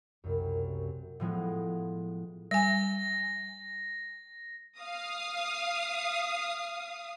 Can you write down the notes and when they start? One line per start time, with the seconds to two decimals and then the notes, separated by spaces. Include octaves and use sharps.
0.24 C2 F#2
1.20 A2 F3 G#3 B3
2.51 G3 G#5 A#6
4.79 F5 D#6